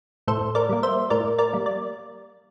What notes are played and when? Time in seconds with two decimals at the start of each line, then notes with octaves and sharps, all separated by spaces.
0.27 A2 A4 C5
0.55 A#4 D5
0.69 G3 A#3
0.83 C5 E5
1.10 A2 A#4 D5
1.38 A#4 D5
1.53 G3 A#3
1.66 D5